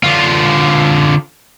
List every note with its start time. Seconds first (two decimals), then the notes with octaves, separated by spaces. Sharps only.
0.04 D3 F4